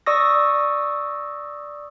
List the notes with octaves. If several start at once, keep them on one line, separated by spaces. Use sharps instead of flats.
D5 C#6 D#6 E6 A#6